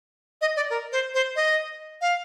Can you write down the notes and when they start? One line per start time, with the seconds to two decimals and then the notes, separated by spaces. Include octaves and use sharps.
0.41 D#5
0.56 D5
0.70 A#4
0.92 C5
1.14 C5
1.36 D#5
2.01 F5